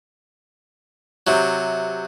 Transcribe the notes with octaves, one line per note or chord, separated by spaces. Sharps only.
C3 F#3